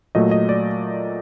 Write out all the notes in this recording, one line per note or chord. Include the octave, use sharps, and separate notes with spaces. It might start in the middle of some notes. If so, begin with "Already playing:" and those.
A#2 F#3 A3 D#5
D#5
D5